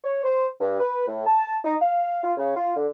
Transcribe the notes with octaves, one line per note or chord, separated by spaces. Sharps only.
C#5
C5
G2
B4
A2
A5
D#4
F5
F4
C#3
F4
D3